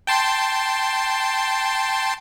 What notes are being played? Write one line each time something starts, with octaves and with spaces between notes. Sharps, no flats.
G5 A5 C6